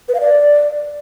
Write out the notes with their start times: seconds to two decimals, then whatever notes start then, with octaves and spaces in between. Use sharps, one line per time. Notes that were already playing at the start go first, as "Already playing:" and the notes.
0.08 B4
0.15 F5
0.21 D5